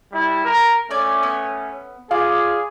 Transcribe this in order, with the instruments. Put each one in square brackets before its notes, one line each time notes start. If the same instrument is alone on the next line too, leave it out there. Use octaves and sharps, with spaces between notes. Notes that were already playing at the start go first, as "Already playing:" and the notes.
[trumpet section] G3 E4
A#4
[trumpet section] A3 C#4 [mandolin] D5 G#5
[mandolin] B3
[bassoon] F4 [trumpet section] G#4 [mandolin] D5